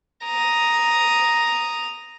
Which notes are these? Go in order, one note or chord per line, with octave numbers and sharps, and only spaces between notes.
A#5 D#6